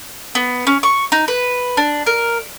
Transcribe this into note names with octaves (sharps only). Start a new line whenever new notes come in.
B3
C#4
C#6
D#4
B4
D4
A#4